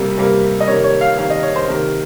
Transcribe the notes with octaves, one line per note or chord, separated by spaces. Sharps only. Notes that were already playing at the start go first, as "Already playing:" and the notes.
Already playing: C3 G3 A#3
C3 G3 A#3
D#5
C3 D#3 A#3 C#5
C#5
F5
C3 D#3 A#3 F5
D#5
C#5
C5
C3 D#3 A#3 A#4